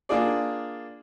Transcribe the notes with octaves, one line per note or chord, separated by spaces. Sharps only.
A#3 D4 F4 G#4 D5